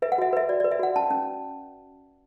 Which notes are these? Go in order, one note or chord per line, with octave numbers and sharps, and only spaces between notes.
B4 E5
F#5
F#4 E5
B4 E5
F#4 D5
B4 D5
E5
F#4 F#5
C#4 A5
C#4